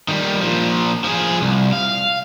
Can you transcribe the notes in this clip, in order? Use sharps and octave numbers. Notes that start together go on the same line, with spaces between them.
D#3 G3
A#2 F3
F3 G#4
C2
F5